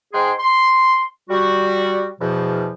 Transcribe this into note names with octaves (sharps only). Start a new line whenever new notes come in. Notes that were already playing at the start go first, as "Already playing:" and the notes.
G#2 G#3 G#4 G5 G#5 C6
C6
G3 F#4
E2 B2 F3